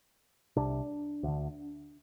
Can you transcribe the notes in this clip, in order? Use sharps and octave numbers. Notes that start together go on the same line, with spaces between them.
C2 C3 D4
D2 D3